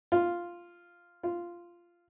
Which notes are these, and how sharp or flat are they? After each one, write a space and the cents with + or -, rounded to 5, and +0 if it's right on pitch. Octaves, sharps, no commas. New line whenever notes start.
F4 -5
F4 -10